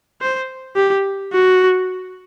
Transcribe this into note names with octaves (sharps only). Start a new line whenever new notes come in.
C5
G4
F#4